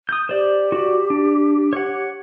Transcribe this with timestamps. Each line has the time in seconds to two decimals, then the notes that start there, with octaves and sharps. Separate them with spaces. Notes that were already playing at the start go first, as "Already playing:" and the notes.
0.09 D#6 G6
0.29 G4 C5 D5
0.72 F#4 D5
1.10 D4
1.73 C#5 F#5